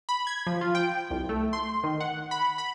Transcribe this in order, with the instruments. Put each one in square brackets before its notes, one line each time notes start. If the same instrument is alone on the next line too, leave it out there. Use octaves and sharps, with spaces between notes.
[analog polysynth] B5
G#6
F3
F4
G5
C2
A3
C6
D#3
F#5
B5
B5